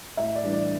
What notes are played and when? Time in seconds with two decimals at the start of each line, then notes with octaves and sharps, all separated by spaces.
0.17 A2 E5
0.35 D5
0.43 E3 G3 D4
0.53 D5